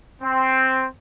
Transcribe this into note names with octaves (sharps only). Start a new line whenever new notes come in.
C4